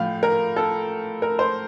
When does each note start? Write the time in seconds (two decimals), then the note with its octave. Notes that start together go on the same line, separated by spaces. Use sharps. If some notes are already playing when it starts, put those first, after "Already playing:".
Already playing: A2 F3 F5
0.23 A#4
0.56 A4
1.22 A#4
1.39 C5